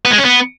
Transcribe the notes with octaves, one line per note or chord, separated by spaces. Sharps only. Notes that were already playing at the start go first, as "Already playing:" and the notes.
B3
G#3
C#4
B3